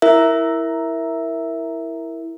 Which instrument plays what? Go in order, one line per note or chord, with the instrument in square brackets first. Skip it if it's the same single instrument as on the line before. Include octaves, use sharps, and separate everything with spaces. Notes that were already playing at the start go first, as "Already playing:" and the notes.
[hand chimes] E4 A#4 E5